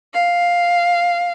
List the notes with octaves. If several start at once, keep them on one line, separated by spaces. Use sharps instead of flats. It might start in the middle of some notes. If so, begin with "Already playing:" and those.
F5